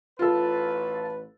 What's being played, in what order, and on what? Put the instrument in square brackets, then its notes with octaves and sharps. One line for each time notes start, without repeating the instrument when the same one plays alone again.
[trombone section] A1 B4 [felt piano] F4 A4